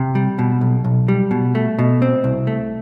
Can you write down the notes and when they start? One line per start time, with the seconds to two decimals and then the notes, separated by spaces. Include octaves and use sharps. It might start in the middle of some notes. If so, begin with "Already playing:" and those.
Already playing: C3
0.15 G3
0.39 B2
0.61 B1
0.84 B1
1.08 G3
1.31 B2
1.55 A3
1.79 B2
2.02 C4
2.24 C2
2.47 A3